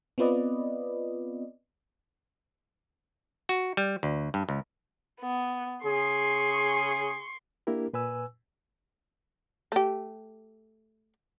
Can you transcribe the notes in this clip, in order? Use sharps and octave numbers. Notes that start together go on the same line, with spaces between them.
B3 C4 F4 B4 D5 D#5
F#4
G3
D2
G2
C#2
B3
C#3 G#4 C6 C#6
A#3 D4 E4 G4 A#4
A#2 B4 G#5 E6
A3 G4